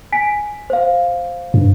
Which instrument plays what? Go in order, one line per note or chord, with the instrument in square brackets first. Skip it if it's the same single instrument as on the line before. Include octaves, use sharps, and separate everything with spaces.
[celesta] G#5 B6 D7
C5 F5
[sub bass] G2